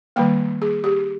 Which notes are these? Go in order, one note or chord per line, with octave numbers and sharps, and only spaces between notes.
D#3 G3 A#3 G5
G#4
G4